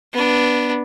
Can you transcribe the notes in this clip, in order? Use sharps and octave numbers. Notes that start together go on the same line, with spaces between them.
B3 D4